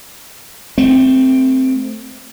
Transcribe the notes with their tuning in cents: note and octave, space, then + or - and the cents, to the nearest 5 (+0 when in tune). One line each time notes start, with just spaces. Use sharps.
A3 +0 C4 +0